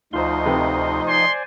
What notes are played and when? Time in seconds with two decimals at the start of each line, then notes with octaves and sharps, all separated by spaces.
0.13 D2 F3 D#4 F4 C5 C6
0.46 C3 A3 B4
1.07 C5 D5 G#5 C6